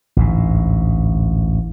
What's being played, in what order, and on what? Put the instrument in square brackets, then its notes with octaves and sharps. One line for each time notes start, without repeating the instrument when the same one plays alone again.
[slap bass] A1 D2 G#2